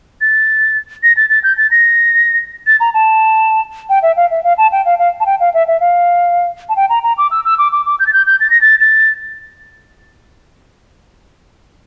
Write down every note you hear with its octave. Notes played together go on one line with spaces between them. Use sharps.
A6
A#6
A6
A6
G6
A6
A#6
A6
A#5
A5
G5
E5
F5
E5
F5
A5
G5
F5
F5
A5
G5
F5
E5
E5
F5
A5
G5
A#5
A#5
D6
E6
E6
D6
D6
D6
G6
A6
G6
G6
A6
A#6
A6
A6